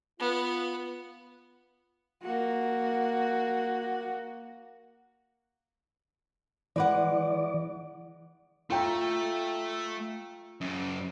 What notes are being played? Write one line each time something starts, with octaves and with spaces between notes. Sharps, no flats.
B3 F4
A#3 F#4
E3 G#3 B4 D5 F#5
A3 F4 G5 A#5
F#2 C#3